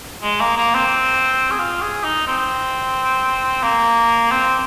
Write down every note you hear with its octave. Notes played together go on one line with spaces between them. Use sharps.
G#3
A#3
A#3
C4
G#4
F4
G#4
D#4
C4
A#3
C4